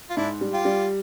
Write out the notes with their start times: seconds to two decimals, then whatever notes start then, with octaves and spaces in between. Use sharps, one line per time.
0.10 F4
0.17 G#2 D4 E4
0.41 G3
0.53 F4 G4
0.65 G3